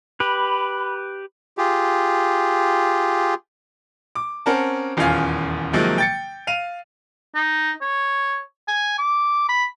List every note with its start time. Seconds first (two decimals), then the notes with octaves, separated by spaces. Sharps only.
0.20 G4 B4 B5
1.58 F4 G4 G#4
4.15 D6
4.46 C4 C#4 A#4 F#5 A5
4.97 D#1 E2 C#4 F4 F5 G#5
5.73 C3 D#3 F3 F#3 G#3 A#3
5.98 G5 A6 C#7
6.47 F5 D#7 F7
7.35 D#4
7.81 C#5
8.68 G#5
8.98 D6
9.49 B5